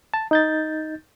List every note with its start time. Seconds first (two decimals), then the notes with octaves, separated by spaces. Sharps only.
0.14 A5
0.31 D#4 G6 A6